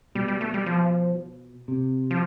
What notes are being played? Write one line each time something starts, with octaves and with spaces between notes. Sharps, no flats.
B2 G3
G3
A3
G3
F3
C3
F3